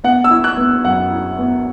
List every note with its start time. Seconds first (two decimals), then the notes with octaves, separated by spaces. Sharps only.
0.04 B3 F#5
0.24 E6
0.30 E4
0.44 F#6
0.57 B3
0.85 F#2 F#5
1.11 E4
1.38 B3